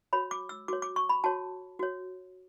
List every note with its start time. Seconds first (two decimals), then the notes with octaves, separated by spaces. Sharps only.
0.13 F#4 C#5 B5
0.31 D6
0.49 E6
0.68 F#4 C#5 D6
0.82 D6
0.96 C#6
1.09 B5
1.24 F#4 C#5 A5
1.79 F#4 C#5